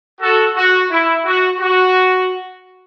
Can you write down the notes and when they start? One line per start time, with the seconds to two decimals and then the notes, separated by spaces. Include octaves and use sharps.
0.21 F#4 A4
0.56 F#4
0.90 E4
1.25 F#4
1.60 F#4